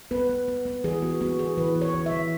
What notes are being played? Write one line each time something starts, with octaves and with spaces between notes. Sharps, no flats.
B3 B4
B3
B3
B3
E3 G#4
B3 F#4
B3 F#4
E3 G#4
E3 B4
B3
C#5
E3
E5
E3